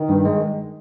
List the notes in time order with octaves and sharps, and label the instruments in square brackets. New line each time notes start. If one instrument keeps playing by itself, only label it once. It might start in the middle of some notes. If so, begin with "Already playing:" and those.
Already playing: [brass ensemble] D#3
[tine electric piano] G2
G#3